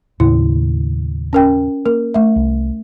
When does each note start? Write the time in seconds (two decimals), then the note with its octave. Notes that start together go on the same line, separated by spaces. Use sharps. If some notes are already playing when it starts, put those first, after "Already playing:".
0.20 D#2 A2 C#3 E4
1.33 C#4 A#4 G5
1.86 A#3 A#4
2.14 A3 E5
2.36 C2